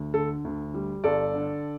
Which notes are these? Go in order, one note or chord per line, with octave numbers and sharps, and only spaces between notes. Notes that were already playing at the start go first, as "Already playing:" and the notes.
Already playing: D2
D3 A4
D2
G3
G1 A4 D5
D3